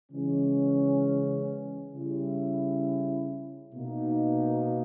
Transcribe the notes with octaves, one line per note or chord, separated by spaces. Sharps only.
C#3 E3 G#3 C#4
C#3 G3 C#4 E4
B2 A#3 D#4